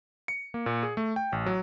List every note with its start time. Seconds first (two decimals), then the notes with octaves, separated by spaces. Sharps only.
0.28 C#7
0.54 A#3
0.66 A#2
0.83 G#4
0.97 A3
1.16 G5
1.32 A1
1.46 F#3